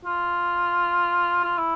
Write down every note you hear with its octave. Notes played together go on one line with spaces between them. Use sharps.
F4
F4
E4